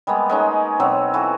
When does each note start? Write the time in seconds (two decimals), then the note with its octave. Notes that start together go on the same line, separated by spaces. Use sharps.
0.07 G3 G#3 A#3 B3
0.29 G#3 C#4 D#4
0.80 B2 F#3 C4 C#4
1.14 E3 F#4 A4